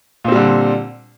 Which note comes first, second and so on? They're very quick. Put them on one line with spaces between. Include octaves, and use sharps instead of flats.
A#2 C4 G3 D3